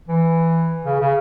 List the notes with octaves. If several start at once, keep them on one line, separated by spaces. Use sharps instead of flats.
E3
C#3
C#3